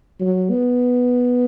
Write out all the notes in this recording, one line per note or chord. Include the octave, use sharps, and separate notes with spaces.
F#3
B3